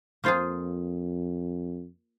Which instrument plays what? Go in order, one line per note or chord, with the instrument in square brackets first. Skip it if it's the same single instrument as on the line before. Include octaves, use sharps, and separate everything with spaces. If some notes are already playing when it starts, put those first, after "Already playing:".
[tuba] F2 [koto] A#3 F4 G#4 C5